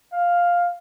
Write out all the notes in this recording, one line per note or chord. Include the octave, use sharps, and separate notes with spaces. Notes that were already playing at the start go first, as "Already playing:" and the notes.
F5